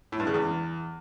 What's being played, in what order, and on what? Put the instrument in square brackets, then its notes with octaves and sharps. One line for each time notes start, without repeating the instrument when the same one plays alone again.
[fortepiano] A2
G2
C#3
E2